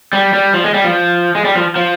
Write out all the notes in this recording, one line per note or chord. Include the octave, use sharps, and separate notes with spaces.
G3
G3
F3
G#3
G3
F3
G#3
G3
F3
F3